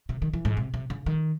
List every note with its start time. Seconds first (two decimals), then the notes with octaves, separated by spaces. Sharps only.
0.09 C3
0.22 D#3
0.33 E3
0.45 G#2
0.57 C3
0.74 C3
0.90 C#3
1.06 D#3